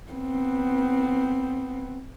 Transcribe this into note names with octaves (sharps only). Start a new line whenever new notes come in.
B3 C4